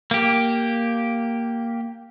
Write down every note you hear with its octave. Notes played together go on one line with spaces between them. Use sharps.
A#3 G4